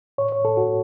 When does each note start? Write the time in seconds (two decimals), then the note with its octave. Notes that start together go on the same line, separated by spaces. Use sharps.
0.18 A2 C#5
0.32 C#5
0.44 A2 A4
0.57 F#4